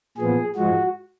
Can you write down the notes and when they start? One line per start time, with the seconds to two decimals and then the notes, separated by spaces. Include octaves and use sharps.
0.17 A#2 F3 B3 G#4
0.56 G#2 F3 G#3 F#4